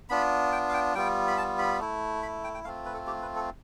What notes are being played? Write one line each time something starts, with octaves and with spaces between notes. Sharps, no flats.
B3 D4 F4 B5
G5
F5
G5
G3 B3 F4 G5
B5
A5
B5
A3 E4
B5
G5
G5
A3 C4 F4 F5
B4
A4
G4
B4
A4